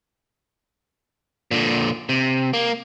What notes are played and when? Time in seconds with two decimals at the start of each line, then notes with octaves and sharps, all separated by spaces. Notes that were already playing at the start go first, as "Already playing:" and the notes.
1.51 A#2 D3
2.09 C3
2.53 A#3